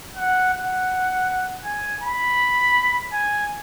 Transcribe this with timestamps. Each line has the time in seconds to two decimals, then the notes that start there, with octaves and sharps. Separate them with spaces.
0.16 F#5
0.54 F#5
1.64 G#5
2.02 B5
3.13 G#5